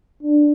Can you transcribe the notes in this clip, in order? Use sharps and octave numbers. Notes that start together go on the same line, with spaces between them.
D4